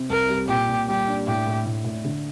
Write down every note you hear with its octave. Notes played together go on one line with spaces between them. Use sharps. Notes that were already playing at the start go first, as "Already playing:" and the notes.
Already playing: C3 C4
C2 A#4
G3
A#2 G4
A#2
G3 G4
D4
A2 G4
A2
A2
A2
D3